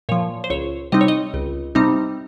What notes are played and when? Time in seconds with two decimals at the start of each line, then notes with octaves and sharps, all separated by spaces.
0.09 A#2 F3 C#5
0.44 C5
0.50 C#2 C#5
0.92 C3 G3 C4 D#4 D#5
1.01 C#5
1.08 D#5
1.34 C#2
1.75 C3 G3 C4 D#4